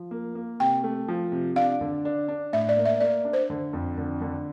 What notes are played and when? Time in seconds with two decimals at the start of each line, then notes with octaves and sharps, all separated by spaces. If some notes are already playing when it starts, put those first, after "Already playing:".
Already playing: F3
0.11 A#3
0.35 A#3
0.60 C3 G5
0.84 A3
1.08 F3
1.32 C3
1.56 D4 F5
1.81 D3
2.05 D4
2.28 D4
2.53 A2 E5
2.69 D5
2.77 A#3
2.86 E5
3.01 A#3 D5
3.25 D4
3.33 C5
3.50 D3
3.73 F2
3.98 D3
4.22 D3